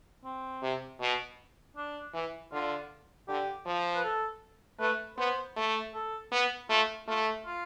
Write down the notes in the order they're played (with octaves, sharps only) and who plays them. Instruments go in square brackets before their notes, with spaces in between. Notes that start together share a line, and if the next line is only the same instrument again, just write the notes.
[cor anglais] C4
[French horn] C3
B2
[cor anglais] D4
[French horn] E3
[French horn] D3 [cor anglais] F4
[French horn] D3 [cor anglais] G4
[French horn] F3
[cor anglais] B4
A4
[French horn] A3 [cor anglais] B4
[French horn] B3 [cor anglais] C5
[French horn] A3
[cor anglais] A4
[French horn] B3
[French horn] A3 [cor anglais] F4
[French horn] A3 [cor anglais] F4
[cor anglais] F4